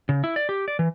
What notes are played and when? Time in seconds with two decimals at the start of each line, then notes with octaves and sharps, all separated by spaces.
0.09 C#3
0.24 E4
0.36 D5
0.49 G4
0.68 D5
0.79 E3